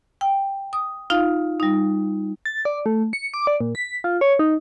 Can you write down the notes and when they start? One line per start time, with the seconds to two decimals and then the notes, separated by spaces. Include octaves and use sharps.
0.21 G5
0.73 D#6
1.10 D#4 F4 F5
1.60 G3 D#4
2.45 A6
2.65 D5
2.86 A3
3.13 C#7
3.34 D6
3.47 D5
3.61 A#2
3.75 B6
4.04 F4
4.21 C#5
4.39 D#4